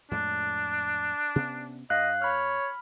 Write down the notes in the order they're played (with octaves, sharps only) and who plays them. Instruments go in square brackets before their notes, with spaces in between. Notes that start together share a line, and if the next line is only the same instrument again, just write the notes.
[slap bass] F2 A2 G#3 [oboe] D4
[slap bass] C3 B3 C#4
[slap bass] G2 [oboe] D#5 [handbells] F5 F#6
[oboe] C#5 [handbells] B5 F6